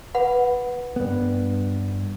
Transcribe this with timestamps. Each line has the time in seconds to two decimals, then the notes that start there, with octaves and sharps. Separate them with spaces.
0.15 B4 F#5 B5
0.96 G2 B3